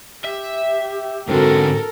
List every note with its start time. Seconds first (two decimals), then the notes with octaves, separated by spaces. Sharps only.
0.25 G4 E5
1.29 G#2 D3 C4 F#4 A4 A#4